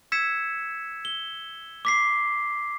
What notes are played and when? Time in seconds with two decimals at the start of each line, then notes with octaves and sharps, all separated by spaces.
0.12 E6 G#6 B6 C#7 E7
1.05 G7
1.85 D6 B6 C7